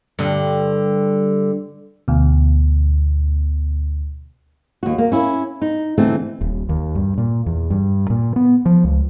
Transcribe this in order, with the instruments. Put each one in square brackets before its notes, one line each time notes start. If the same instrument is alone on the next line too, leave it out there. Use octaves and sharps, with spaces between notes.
[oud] G2 D3
[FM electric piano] D2 B2
[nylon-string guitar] D#2 F#4
A#3
C#4 E4
D#4
D3 E3 A3 C4
[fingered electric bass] D#1
D#2
G2
A#2
E2
G2
A#2
B3
F3
C#2